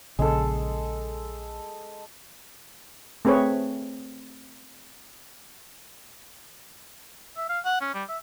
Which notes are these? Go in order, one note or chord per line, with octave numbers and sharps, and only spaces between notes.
A#1 C#3 G#3 A4
A3 C4 G#4 B4 C#5
E5
F5
F#5
C#4
G3
E5